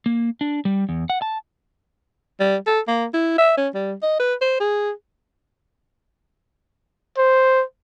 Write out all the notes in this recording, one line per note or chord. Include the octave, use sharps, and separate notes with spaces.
A#3
D4
G3
E2
F#5
A5
G3
A4
A#3
E4
E5
C#4
G3
D#5
B4
C5
G#4
C5